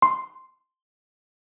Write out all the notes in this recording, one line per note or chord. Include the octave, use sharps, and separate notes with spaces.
C6